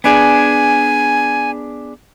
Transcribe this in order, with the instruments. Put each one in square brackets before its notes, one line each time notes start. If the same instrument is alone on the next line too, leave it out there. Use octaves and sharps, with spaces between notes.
[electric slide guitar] B3 D4 G#4 [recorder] G#5